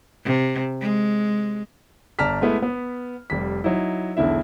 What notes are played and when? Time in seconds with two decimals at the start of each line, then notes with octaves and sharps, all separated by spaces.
0.25 C3
0.81 G#3
2.19 G1 D5 A5 A#5 F6 B6
2.41 G#3 A3 B3 E4
2.62 B3
3.30 F1 G3 B6
3.64 F#3 D#4 E4
4.17 E1 B1 D3 E4 E5